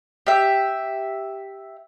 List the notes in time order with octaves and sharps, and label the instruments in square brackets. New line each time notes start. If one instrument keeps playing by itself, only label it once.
[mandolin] G4 E5